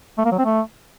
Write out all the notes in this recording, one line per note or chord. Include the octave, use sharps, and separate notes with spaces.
A3
A#3
F#3
C4
A3